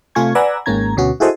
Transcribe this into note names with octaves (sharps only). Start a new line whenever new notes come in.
C3 A3 F4 G#5 C#6 G#6
B4 D5 F#5 G#5 A#5 E6
G#1 G#2 A#3 C#4 A#5 G#6
D2 B2 C#4 F#4
E4 F#4 G#4 A4 C5 D#5